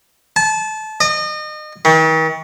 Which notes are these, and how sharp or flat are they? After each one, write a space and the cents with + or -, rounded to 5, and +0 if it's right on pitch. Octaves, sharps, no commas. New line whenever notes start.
A5 -25
D#5 -35
D#3 +45